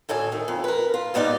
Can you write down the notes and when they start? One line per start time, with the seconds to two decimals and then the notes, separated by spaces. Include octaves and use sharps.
0.09 D2 A2 A4 G#5
0.32 D#3
0.48 F2
0.64 A#4 B4
0.94 F4
1.14 G#2 G3 B3 D#4 D5